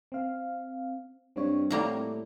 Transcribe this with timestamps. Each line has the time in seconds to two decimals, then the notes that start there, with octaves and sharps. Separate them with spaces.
0.12 C4 F5
1.36 G2 C4 C#5
1.70 A2 G3 A#3 A#5